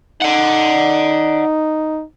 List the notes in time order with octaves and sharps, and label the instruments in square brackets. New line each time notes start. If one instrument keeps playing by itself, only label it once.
[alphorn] D#4 [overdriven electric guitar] D5 F#5